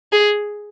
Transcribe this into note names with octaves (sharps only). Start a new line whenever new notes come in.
G#4